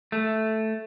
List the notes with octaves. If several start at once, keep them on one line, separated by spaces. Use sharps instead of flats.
A3